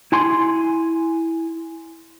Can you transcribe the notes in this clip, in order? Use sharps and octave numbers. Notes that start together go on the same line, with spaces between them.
E4 G#5 C6